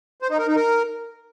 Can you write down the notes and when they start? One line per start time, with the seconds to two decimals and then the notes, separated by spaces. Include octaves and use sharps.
0.22 C5
0.30 D#4
0.39 A#4
0.48 D#4
0.56 A#4